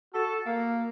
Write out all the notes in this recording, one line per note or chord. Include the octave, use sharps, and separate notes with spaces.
F#4 A4
A#3